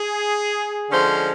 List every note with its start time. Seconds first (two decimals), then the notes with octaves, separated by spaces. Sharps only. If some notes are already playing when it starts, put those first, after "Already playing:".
Already playing: G#4
0.90 D3 F3 G#3 C#4 C5